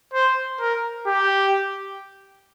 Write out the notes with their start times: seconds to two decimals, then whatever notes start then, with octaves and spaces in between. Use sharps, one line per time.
0.14 C5
0.60 A#4
1.07 G4